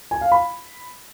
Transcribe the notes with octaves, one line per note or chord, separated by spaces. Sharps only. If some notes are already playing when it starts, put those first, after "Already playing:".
G#5
F5
B5